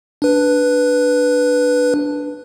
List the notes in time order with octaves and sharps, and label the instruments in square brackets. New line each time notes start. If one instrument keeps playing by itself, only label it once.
[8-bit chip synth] D4 B4